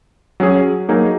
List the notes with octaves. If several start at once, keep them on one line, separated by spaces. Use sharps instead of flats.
F#3 C#4 G#4
F#3 A#3 D#4 G#4